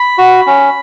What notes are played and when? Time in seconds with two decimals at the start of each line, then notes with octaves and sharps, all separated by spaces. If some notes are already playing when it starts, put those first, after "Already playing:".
Already playing: B5
0.18 F#4
0.47 C#4